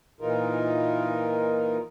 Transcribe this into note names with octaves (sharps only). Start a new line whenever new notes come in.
A#2 E3 D#4 F4 A#4